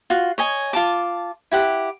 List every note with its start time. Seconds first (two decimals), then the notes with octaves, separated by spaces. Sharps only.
0.10 F4 F#4
0.38 C#5 D#5 G#5
0.73 F4 A5 D6
1.51 E4 G4 F#5